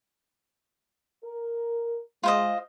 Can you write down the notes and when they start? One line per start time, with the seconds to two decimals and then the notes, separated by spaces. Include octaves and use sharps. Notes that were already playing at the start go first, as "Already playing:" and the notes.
1.24 A#4
2.23 G#3 F4 C5 D#5